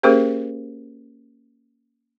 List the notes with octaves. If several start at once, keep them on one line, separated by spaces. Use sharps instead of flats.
A#3 C#4 G4 G#4 A#4 C5